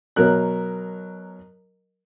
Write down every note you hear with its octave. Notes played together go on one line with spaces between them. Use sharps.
B2 F#3 A#4 F#6